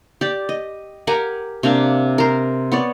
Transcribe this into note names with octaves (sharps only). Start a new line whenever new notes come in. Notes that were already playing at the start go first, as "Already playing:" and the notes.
G4 D5
D#5
G4 A#4 F#5 G#5
C3 A#3 D4 F5
A#4 C5
B3 C#5 D5